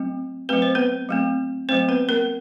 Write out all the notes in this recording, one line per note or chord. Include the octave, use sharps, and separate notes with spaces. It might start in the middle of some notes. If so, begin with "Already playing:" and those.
Already playing: F#3 A3 C4
F#3 A3 C4 B4
C5
B3 B4
F#3 A3 C4
F#3 A3 C4 C5
B3 B4
A#3 A#4